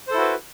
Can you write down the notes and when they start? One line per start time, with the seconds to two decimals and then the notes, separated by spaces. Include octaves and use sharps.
0.07 C5
0.11 A4
0.14 E4
0.17 F#4
0.21 B4